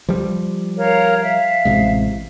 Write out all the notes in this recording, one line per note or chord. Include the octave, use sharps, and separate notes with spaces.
F3 G3
A#4 C#5 F5
E5 F5
A1 C3 G#3